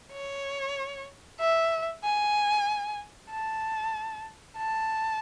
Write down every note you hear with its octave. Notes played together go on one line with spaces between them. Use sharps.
C#5
E5
G#5
A5
A5